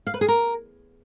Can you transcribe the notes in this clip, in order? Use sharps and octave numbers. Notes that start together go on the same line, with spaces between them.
F5
B4
G#4
A#4